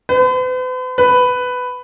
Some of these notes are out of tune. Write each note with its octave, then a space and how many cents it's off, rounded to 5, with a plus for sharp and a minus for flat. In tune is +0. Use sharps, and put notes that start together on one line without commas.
B4 +45
B4 +10